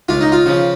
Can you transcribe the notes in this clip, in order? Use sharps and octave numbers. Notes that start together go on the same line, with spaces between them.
C#2 F4
D#4
F4
C#3 F3